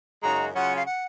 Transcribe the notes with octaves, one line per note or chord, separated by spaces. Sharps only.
F#2 C#3 G#3 D#4 F#4 A#5
C#3 F#3 C#4 F4 F#5
F5
F#5